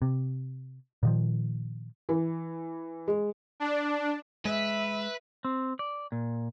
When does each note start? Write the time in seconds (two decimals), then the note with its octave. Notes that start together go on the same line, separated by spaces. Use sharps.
0.02 C3
1.03 A#2 D#3 F3
2.09 E3
3.08 G#3
3.60 D4
4.45 G#3 B4 E5
5.45 C4
5.79 D5
6.12 A#2